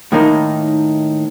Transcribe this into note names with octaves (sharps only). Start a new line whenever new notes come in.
A2 D#3 A#3 D#4